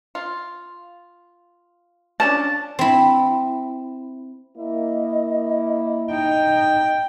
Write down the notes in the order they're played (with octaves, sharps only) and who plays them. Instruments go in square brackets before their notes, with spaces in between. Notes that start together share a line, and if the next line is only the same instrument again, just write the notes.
[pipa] F4
[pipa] F3 C#4 D4 [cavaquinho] A5
[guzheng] C4 E4
[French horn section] A#3 E4 [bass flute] D#5
[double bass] D#4 [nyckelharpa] G5